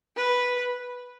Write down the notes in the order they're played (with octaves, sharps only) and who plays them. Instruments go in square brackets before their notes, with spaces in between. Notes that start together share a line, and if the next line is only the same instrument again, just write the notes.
[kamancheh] B4